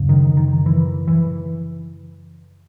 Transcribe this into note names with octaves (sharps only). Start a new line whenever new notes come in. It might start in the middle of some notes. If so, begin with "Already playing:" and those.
Already playing: F#2 C#3
D#3
D#3
E3
E3